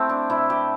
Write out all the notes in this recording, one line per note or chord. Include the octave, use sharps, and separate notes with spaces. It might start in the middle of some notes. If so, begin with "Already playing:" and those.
Already playing: A3 C4 E4 G4 A4
D4
C3 E4
G4